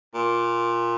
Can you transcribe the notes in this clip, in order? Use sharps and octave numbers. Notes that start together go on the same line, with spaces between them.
A#2